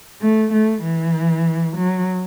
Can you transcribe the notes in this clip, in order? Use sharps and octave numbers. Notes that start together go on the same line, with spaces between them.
A3
A3
E3
F#3